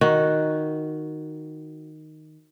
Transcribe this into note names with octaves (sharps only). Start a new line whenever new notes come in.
D#3 F#4